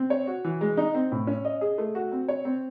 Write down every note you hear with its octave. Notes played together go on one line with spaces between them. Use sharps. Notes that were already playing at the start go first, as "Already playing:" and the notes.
Already playing: C4
C#5
F#4
E3
G#3
D#4
C4
A2
C#4
D#5
G#4
A3
F#4
C4
C#5
C4